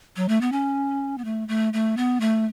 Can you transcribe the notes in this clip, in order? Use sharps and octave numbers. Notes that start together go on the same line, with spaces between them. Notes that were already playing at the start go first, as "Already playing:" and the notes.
F#3
A3
B3
C#4
B3
A3
A3
A3
B3
A3